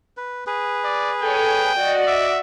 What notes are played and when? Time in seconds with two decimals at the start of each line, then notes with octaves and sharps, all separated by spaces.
0.17 B4
0.47 G#4 B4
0.84 D5
1.23 A4 C#5 G5 G#5
1.76 F#4 D5 D#5
2.07 E5 D6